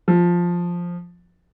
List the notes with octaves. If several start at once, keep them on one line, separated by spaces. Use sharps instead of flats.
F3